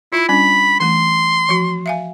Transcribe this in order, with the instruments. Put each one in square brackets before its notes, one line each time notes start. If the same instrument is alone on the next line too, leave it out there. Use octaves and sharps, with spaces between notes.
[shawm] E4 [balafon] F4 B5
[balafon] G3 C#4 D4 [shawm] B5
[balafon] E3 A3 [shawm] C6
[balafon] F3 F#4
E5 F5 G#5